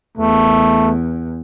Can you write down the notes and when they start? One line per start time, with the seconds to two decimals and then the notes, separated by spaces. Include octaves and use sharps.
0.17 E2 A3